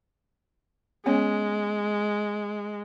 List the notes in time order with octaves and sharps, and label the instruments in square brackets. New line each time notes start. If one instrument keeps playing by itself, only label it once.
[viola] G#3 [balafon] B3 C#4 C#5